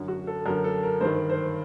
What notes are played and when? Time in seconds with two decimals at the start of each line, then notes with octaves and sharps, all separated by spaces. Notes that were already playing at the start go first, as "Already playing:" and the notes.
Already playing: F#2 D3
0.08 F#4
0.27 A4
0.46 F#2 A#4
0.50 D3
0.64 A4
0.83 A#4
1.01 G2 D#3 C5
1.29 C5